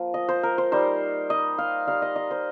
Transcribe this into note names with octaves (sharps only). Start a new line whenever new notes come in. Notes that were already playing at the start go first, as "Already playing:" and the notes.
Already playing: F3 A#3 F4
D#5
C5
A#4
C5
G3 D#4 C5
D#5
F5
G3 D#4 F5
D#5
D#5
C5